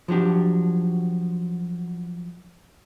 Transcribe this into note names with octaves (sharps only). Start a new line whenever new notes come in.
F3 F#3 D4 G4